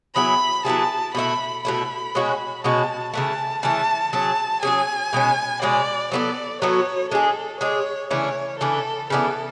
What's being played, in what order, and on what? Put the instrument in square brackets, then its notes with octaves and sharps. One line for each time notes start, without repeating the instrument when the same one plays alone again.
[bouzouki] F#3 B3 E4 G#4 [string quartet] B5
[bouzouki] F#3 B3 E4 G#4 [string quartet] A5
[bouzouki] B2 A3 E4 [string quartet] B5
[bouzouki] B2 A3 E4 [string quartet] B5
[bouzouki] B2 G#3 C#4 F#4
[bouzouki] B2 G#3 C#4 F#4 [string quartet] A5
[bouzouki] C#3 E3 A3 [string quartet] A5
[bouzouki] C#3 E3 A3 [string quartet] A5
[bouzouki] F#3 C#4 G#4 [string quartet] A5
[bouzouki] F#3 C#4 G#4 [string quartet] G#5
[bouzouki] B2 G#3 C#4
[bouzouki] B2 G#3 C#4 [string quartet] D5
[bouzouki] F#3 B3 F#4 A4 [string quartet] D5
[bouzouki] F#3 B3 F#4 A4 [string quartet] C#5
[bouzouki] G#3 D4 G#4 [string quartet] A4
[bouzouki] G#3 D4 G#4 [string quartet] C#5
[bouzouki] C#3 E3 A3 D4 [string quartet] C#5
[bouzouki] C#3 E3 A3 D4 [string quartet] A4
[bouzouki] C#3 E3 B3 D4 [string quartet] A4